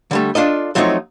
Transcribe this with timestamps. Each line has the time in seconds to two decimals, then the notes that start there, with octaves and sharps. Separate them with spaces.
0.11 D3 G3 A3
0.35 D4 F4 A4 D#5
0.75 F3 F#3 A3 C4 D#4 C#5